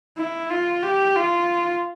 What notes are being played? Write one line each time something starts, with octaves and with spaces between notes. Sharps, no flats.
E4
F4
G4
F4